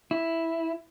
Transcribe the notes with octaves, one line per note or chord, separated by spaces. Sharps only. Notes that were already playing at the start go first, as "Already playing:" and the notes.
E4